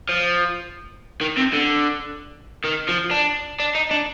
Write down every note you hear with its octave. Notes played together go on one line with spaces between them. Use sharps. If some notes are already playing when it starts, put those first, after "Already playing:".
F3
D#3
C3
D3
D#3
F3
D4
D4
D#4
D4